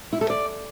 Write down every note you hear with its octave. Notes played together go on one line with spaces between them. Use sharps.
E4
A4
D5